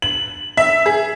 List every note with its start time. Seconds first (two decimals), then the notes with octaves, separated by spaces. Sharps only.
0.02 F#7
0.57 E5
0.86 G#4